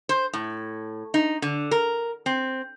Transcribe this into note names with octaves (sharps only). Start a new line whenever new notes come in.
C5
A2
D#4
D3
A#4
C4